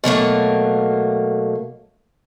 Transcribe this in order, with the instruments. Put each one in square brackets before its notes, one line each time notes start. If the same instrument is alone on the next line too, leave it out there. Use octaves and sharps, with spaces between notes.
[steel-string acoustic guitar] B2 F#3 A3 A#3